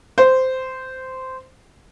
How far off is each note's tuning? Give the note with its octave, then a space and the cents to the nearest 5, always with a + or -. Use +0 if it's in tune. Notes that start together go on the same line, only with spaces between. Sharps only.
C5 -10